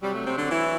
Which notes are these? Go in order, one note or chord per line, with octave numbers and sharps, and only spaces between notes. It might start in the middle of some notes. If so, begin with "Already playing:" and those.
C3 F#3 G3
A3
C3 C4
D3 D4
E3 E4